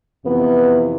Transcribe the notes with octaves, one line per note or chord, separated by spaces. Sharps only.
F2 C3 E3 B3